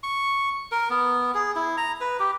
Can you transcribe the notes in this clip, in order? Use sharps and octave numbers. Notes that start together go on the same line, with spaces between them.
C#6
A#4
B3
G#4
E4
A#5
B4
G4